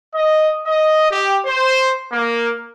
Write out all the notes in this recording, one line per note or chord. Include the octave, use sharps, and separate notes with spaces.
D#5
D#5
G4
C5
A#3